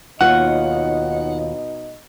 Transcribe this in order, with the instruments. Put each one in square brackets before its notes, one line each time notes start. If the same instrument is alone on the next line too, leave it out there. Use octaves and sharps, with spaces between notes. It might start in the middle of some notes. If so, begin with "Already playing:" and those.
[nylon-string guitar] D#2 F4 C#5 [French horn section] B2 D#4 D#5 [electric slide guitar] F#5